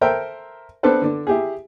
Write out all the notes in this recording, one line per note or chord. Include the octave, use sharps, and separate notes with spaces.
A4 A#4 C5 E5 G5
B3 C4 D4 A4 B4 C5
D3 D4
E4 G4 G#4